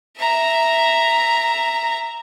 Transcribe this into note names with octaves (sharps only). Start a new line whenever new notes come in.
E5 A#5